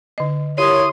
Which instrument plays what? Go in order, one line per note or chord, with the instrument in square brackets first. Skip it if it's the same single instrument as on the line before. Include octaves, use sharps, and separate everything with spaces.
[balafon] D3 D#5
[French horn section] E4 A#4 C#5 [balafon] G4 [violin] C6 [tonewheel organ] D#6